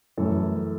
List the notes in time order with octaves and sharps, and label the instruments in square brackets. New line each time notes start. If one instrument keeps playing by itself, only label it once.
[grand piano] F#2 E3 A3 A4